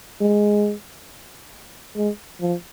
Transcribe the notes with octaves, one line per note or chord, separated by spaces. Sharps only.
G#3
G#3
F3